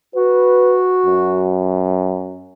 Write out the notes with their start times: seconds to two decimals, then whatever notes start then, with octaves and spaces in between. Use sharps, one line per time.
0.15 F#4 B4
1.06 F#2